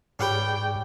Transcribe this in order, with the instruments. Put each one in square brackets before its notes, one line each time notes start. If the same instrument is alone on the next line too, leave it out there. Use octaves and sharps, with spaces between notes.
[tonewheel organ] G#2 G#4 D5 [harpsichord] C#4 G4 B4 [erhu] G5